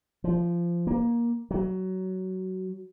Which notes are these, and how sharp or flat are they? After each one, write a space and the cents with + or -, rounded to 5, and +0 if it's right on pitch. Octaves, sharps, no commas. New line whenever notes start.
F3 -20
A#3 +15
F#3 +15